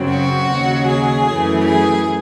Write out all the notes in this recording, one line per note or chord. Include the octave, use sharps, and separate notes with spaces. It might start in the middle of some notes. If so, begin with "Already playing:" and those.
Already playing: F#2 C#3 F#3 C4
F#4
D#2 C#3 F#3
G#4
F#2 E3 A3
G#4